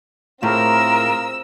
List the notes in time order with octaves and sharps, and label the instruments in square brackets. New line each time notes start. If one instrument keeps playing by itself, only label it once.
[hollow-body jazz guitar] A2 [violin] C4 E6 [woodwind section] F4 G#4 A#4